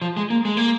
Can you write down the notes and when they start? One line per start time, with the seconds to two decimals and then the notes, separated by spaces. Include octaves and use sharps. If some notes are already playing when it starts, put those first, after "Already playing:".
0.02 F3
0.17 G#3
0.30 A#3
0.45 G#3
0.57 A#3